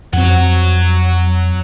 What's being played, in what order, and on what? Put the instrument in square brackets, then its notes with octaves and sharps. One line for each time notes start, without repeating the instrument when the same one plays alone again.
[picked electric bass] F2 C4 [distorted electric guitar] F#3 F#5